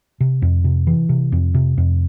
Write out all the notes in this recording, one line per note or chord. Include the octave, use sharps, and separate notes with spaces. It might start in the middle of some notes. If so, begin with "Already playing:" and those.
C3
F2
C3
E3
C3
F2
C3
F2